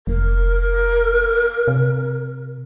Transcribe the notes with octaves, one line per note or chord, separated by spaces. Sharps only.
F1 A#4
C3